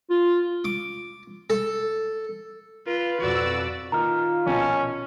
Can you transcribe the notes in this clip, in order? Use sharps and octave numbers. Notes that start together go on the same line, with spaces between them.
F4
D6
A4
F4 B4
F2 B2 F#4 D5 E6
D#3 A#3 D#4 F4 A#5 F6
A#1 B2 C#4 A5